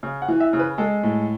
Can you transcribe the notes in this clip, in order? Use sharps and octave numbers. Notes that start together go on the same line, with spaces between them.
C#3
F#5
E3
E5
C#3
B4
G#3 A4
A2